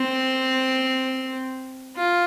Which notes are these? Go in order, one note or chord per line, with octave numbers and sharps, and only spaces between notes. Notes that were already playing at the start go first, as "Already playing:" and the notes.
Already playing: C4
F4